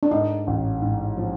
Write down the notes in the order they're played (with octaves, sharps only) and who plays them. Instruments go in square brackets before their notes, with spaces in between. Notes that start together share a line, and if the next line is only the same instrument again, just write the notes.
[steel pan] D4
[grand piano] G#2 [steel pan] D#4
[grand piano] A1
G#2
F3